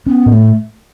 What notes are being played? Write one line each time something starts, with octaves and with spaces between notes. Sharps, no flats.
B3 C#4
A2
A3